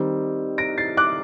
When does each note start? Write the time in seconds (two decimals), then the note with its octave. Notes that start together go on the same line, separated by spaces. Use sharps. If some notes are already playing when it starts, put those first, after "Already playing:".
Already playing: D#3 G3 C4
0.58 A#6 D7
0.78 A6 C7
0.97 D6 F#6